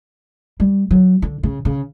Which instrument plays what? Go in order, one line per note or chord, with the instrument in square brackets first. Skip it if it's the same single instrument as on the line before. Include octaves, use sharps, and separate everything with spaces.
[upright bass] G3
F#3
D3
C#3
C#3